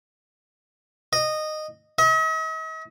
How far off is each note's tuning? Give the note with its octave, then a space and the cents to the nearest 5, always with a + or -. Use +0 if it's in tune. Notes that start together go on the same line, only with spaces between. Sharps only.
D#5 -15
D#5 +45